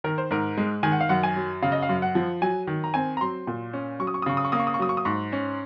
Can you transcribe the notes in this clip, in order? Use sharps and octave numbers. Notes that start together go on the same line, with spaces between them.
D#3 A#4
C5
G#2 A#4
G#3
D#3 G#5
F#5
F5
F#2 F#5
G#5
F#3
C#3 F5
D#5
F5
F#2
F#5
F3
F#3 G#5
D#3
A#5
C4 G#5
A#5
F#3 C6
A#2
C#4
F#3 C#6
D#6
C#6
D#6
C#3 C#6
D#6
C#6
A#3 D#6
C#6
D#6
C#6
F#3 D#6
C#6
D#6
G#2 C#6
C#4